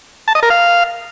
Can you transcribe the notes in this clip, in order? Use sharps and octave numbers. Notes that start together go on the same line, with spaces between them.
A5
D#5
A#4
F5